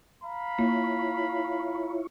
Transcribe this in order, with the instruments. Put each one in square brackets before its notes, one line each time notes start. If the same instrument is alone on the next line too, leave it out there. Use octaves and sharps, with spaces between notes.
[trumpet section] F5 A#5 B5
[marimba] A#3 [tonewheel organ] E4 F4 C#5